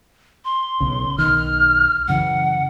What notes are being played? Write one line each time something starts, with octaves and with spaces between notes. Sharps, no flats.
C6
B1 C#3
B1 D#3 F6
F#2 C#3 E3 F#5